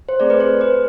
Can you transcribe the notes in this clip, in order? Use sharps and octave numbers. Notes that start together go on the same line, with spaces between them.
C5
A3 C4 G#4 D5
B4
C5
B4